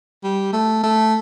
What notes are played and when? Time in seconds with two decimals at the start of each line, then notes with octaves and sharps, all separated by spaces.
0.23 G3
0.53 A3
0.83 A3